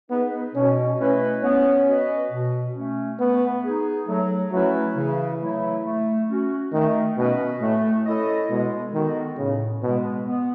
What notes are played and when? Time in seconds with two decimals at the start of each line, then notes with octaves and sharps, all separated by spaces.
0.10 B3 D#4 G#4 B4 D#5
0.55 B2 C#4
0.99 A3 C#4 E4 B4 D#5
1.43 B3 C#4
1.87 F#4 B4 D#5
2.31 B2
2.75 A3 C#4
3.20 A3 B3
3.64 D#4 G#4
4.08 F#3 A3
4.52 F#3 A3 C#4 E4 B4
4.96 C#3 E3
5.40 F#3 A3 E4
5.85 A3
6.29 C#4 F#4
6.72 D#3 A3
7.17 B2 C#4 F#4 B4 D#5
7.61 A2 A3
8.05 C#4 E4 A4 D#5
8.50 B2 G#3
8.94 D#3 B3 F#4 A4
9.38 A2 C#3
9.82 B2 G#3 B3
10.27 B3